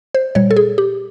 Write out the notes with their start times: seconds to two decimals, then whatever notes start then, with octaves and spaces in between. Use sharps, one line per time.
0.15 C5
0.35 A#2 G3 C#5
0.51 A4
0.57 G#4
0.78 G4